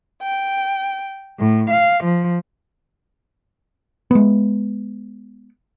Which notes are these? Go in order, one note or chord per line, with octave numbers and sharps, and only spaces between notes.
G5
A2
F5
F3
G#3 B3